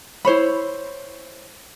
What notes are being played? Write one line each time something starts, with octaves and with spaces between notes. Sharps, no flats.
E4 C5 C#5 B5